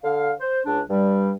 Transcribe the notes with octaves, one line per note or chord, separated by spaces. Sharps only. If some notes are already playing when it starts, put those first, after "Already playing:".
D3 F5
C5
C#2 D4
G2 G3